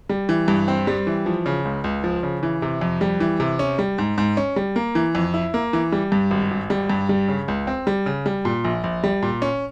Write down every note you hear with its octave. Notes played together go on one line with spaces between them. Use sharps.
G3
E3
G2
C4
G3
E3
F3
C#3
C#2
C#2
F3
C#3
E3
C3
F2
G3
E3
C3
C#4
G3
G#2
G#2
C#4
G3
A#3
E3
F2
E4
A#3
E3
G3
G2
G#1
G#1
G3
G2
G3
C#3
C#2
C4
G3
C#3
G3
A#2
A#1
A#1
G3
A#2
C#4